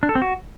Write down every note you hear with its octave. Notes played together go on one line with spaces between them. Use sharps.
D4
A4
C4
F#4